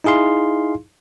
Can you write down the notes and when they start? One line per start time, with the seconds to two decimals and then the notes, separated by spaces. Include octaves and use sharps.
0.04 D#4 E4 G#4 F5 C6